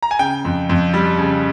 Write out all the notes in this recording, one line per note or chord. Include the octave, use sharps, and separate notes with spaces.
A#5
G#5
C#3 G5
F2
F2
G3
C#3